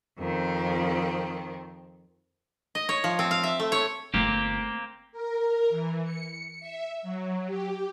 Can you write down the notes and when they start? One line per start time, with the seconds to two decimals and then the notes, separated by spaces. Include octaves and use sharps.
0.19 F2 D#3 C4
2.75 D#5
2.89 C#5
3.04 F3
3.19 C4
3.31 F5
3.44 E5
3.60 A3
3.72 C#5
4.14 G1 A3 A#3 C4 G4
5.12 A#4
5.69 E3
6.04 C#7
6.60 E5
7.02 F#3
7.47 G4